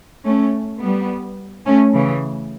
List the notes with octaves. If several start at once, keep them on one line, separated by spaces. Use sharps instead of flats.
A3 C#4
G3 B3
A3 C#4
C#3 E3